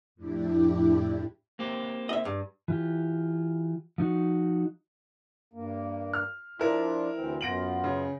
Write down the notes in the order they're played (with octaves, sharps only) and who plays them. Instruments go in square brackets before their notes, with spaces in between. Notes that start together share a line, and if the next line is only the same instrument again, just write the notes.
[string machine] F2 A2 D4 E4 G4
[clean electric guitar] A#3 C4 G4
[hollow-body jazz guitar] D#5 E5
G2
[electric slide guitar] E3 F4 G4
F3 D#4 F#4
[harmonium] G2 A#3
[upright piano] F6
[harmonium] F3 D4 F4 [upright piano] E4 A#4
[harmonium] D2 E3 C4
[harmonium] F#2 B3 F4 [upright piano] A#6 D7 F#7
[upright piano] C#3